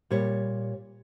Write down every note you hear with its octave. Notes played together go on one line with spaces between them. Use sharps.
A#2 G3 C#5